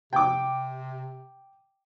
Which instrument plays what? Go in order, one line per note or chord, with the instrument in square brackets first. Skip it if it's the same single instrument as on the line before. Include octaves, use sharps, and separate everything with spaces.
[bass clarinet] C3 [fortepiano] G5 D6